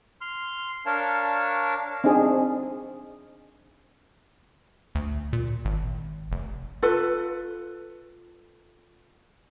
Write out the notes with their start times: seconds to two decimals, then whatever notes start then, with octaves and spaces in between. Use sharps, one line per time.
0.21 C6 F6
0.86 D4 A#4 C#5 F5 A5
2.04 C4 D4 D#4 G#4
4.95 D2
5.33 A#2
5.65 G#1
6.32 F1
6.83 F4 A4 B4